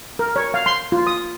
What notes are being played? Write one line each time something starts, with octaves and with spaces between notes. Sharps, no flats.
A#4
C#5
F5
C6
F4
D#6